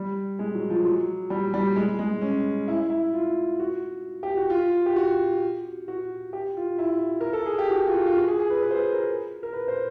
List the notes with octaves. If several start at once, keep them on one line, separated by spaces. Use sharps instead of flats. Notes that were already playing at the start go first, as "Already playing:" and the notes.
Already playing: G3
G#3
F#3
F3
F#3
G3
G3
G#3
G#3
C#4
E4
E4
F4
F#4
G4
F#4
F4
G4
F#4
F#4
G4
F4
E4
A#4
A4
G#4
G4
F#4
F4
F#4
F4
F#4
G#4
G#4
B4
B4
C5
B4
A#4
A#4
B4
C5